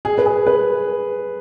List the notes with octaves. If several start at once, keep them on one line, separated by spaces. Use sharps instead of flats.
G#4
B4
G#4
B4